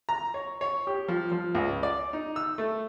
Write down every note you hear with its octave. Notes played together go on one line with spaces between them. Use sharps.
A#5
C#5
C#5
G4
F3
F3
C#2
D5
D#4
E6
A3